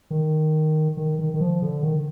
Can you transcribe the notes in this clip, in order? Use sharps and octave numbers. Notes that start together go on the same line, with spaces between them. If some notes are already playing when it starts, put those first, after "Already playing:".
D#3
D#3
D#3
D#3
F3
D3
D#3